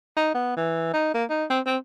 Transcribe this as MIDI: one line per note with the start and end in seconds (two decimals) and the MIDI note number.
0.17 0.34 63
0.35 0.56 59
0.57 0.93 52
0.93 1.10 63
1.14 1.24 58
1.30 1.45 63
1.50 1.60 60
1.66 1.77 60